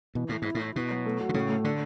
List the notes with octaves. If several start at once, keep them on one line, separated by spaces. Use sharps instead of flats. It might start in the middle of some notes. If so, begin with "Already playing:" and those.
B2 E3
A2 E3
G#2 E4
A2
E4
B2 E4
F#3
A3
F#4
D3
A2 C#3
A3
D3 D4